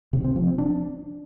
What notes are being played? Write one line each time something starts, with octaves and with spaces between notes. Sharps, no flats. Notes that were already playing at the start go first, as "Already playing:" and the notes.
C3
C4
F3
C4
D4